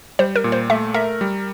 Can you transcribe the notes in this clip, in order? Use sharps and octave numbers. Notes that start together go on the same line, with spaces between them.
G3 C5
A#4
A#2
C5
A3 E5
A#4 E5
G3